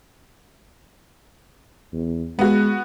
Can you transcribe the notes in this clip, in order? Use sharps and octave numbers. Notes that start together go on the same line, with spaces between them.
E2
G#3 B3 F#4